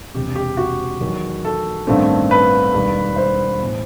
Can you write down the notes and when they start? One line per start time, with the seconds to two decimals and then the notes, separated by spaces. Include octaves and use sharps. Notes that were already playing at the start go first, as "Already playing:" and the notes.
0.15 E1 E2 C3 G4
0.36 G4
0.57 F#4
1.01 E2 D#3 F#3
1.45 A4
1.87 A1 G2 D#3 A3 C4
2.31 B4
2.73 E1 D#2 D#3 G3
3.16 C5
3.60 A2 E3 B3